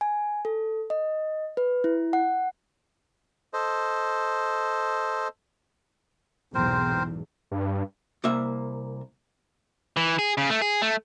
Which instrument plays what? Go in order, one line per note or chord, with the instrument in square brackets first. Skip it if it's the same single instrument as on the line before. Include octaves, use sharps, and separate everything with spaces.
[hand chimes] G#5
A4
D#5
B4
E4
F#5
[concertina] A4 C5 D#5
[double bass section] B1 E2 G#2 [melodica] C4 A#4 C5
[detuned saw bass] G2
[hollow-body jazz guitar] C2 A#3 E5
[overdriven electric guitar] E3
G#4
C#3
A3
G#4
A3